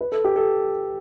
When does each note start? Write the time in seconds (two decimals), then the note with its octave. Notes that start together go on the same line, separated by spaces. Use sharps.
0.01 B4
0.12 A4
0.24 G4
0.36 A4